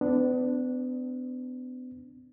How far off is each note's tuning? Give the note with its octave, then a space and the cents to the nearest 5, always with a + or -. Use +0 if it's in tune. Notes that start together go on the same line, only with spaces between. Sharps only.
B3 +40 D4 +0